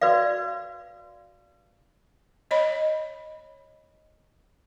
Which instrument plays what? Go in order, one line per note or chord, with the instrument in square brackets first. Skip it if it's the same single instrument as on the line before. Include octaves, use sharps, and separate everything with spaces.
[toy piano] F#4 B4 D5 F5
[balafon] C#5 D#5 B5